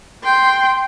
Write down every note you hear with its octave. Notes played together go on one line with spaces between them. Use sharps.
G5 C6